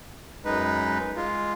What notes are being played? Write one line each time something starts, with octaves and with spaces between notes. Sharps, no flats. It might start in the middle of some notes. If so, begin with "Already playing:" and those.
F#2 G#3 D#4 B4
G#3 F4